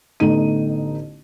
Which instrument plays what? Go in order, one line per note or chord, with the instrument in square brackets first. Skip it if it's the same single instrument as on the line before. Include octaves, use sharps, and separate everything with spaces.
[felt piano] A1 D3 B3 D#4 D#7